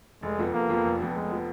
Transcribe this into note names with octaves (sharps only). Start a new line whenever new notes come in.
F1 G#3
F2 F3 B3
F1 A#3
F2 F3 B3
F1
F2 F3 B3
F1 G#3
F3 B3